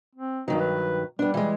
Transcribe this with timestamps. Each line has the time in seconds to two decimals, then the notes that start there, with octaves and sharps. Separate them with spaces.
0.15 C4
0.48 G2 D#3 F#3 D#4
0.60 B4
1.19 G3 B3 D4
1.34 E3 G#3